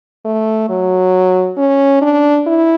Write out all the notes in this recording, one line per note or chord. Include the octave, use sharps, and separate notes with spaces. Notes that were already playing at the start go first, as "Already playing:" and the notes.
A3
F#3
C#4
D4
E4